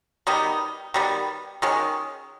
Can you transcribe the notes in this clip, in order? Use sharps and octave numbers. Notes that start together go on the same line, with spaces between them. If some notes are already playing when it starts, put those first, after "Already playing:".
D#3 G3 B3 D#4
D#3 G3 B3
D#3 G#3 C#4